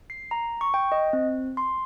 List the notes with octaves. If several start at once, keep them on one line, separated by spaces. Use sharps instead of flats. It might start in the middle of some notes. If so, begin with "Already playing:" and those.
C7
A#5
C#6
G5
D#5
C4
C6